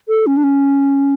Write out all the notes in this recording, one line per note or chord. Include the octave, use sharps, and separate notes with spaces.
A4
C#4
D4
C#4